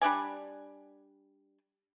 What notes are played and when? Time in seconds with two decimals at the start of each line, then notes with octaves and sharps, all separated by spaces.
0.02 G3 D4 D5 G#5